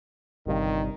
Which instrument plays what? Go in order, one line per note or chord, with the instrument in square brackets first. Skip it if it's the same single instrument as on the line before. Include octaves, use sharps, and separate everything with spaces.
[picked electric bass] G1 G2 C3 [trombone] D#3